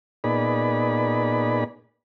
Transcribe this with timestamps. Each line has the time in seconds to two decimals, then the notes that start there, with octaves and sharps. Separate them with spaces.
0.24 A#2 B3 D#4 G#4 D5 B5